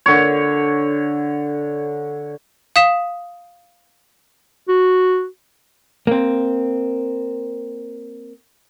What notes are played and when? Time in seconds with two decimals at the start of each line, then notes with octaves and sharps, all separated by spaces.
0.06 D3 C#5
2.76 F5 D#6 B6 E7
4.68 F#4
6.07 A#3 C4